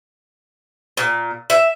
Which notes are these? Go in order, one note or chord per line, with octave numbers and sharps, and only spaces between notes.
A#2
E5